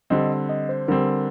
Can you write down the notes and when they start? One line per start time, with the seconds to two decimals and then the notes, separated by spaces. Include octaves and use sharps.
0.10 D3 G3 C4 D#5
0.49 D#5
0.69 C5
0.88 D3 G3 C4 A#4